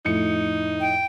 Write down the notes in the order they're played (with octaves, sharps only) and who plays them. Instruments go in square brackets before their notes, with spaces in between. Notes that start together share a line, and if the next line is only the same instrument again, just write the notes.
[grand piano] F2 A2 C#7 [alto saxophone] D#4
[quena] G5